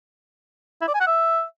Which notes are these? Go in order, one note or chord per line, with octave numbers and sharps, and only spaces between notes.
E4
D5
G#5
F#5
E5